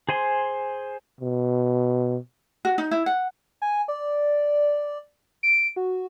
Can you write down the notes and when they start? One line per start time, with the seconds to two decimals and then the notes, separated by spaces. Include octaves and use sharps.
0.09 G#4 C5 G#5 C6
1.20 B2
2.65 F#4
2.78 D#4
2.91 E4
3.06 F#5
3.62 G#5
3.88 D5
5.43 D7
5.76 F#4